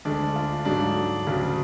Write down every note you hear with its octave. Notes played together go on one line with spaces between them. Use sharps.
D2 D3 G#3 D4
F4
G#2 F#3 D4
D2 C#3 F#3